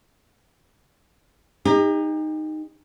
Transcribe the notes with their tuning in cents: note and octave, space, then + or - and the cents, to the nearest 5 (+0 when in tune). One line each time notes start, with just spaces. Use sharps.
D#4 -5 G4 +40